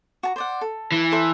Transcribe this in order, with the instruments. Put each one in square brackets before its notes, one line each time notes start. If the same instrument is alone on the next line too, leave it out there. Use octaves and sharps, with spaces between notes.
[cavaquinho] F#4 A5 A#5
C5 D5 F#5
A4
[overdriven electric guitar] E3
[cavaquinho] A4 C5 E5